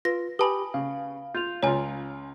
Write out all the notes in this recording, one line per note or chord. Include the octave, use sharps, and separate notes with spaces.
F4 B4 A#6
G4 B4 G#5 A5 B5 D#6 F#7
C#3 F5
F4 G6 F7
C#2 F4 C#5 G#5 A#5